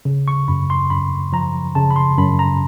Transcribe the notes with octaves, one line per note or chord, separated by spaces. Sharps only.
C#3
C#6
F#2 B5
C6
F#2 B5
F3 A#5
C#3 A5
B5
C6
F#2 B5
A#5